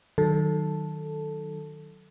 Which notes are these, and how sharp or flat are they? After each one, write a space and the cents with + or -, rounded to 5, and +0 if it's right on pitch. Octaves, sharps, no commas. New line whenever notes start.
D#3 -15 F#3 +5 A4 +0